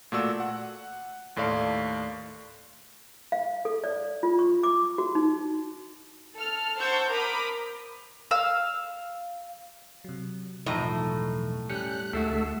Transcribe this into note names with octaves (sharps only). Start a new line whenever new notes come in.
A#2 A3 F#4 D5 E6
F#5
D#2 A2 A4 D5 F5 C6
F5
A4
D5
F4
C#6
D6
F#4
D#4
A4 F6
C5 F#5 A5 C#6 E6 G6
A#4 A#5 B5 D6 D#6
F5 E6
C3 F#3
B1 E2 A2 F3 D#4 D#5 A#5 C#6
G3 C#4 G4 F#6 G6 C#7
D2 G#3 A3 E4 F#4 A4 B6 C7